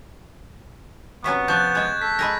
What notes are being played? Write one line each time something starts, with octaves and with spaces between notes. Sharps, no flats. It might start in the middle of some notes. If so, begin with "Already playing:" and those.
C3 F#3 B3 C#4 C#6 B6
F3 C#6 F#6 G6 A6 E7
G#3 E5 G#6
A4 B6
G#3 G#4 A#4 B5 A#6